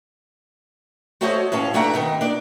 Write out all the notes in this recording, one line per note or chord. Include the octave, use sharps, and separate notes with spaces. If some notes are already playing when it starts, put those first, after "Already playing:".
A3 F#4 A4 C5 C#5 D#5
A2 C#4 F5 A5
G2 A3 D4 E5 F#5 A#5
B2 D#3 D#4
D4 D5